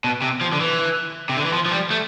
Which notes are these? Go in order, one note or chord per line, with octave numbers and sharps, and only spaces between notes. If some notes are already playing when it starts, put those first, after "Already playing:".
B2
C3
F3
D3
E3
C3
D3
E3
F3
F3
G3
A3